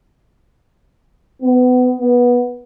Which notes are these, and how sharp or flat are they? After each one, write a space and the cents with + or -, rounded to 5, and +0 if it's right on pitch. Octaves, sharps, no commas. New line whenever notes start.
B3 +25
B3 -15